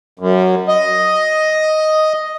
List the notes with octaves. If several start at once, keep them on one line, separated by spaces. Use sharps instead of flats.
F#2
D#5